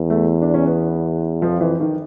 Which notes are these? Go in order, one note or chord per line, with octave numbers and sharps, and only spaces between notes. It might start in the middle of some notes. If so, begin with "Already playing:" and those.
Already playing: E2
A3
D4
C#4
B3
F2 F3
E3
D#3